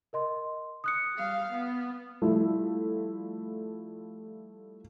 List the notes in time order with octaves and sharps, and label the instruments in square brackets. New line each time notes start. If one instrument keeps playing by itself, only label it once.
[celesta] A#4 D#5 C6
D#6 F#6 C#7
[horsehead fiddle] G3 F5
B3
[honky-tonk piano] F3 G3 A3 E4